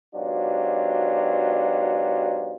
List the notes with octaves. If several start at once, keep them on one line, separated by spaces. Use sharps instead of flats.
G#2 B2 F#3 D4 F4 G4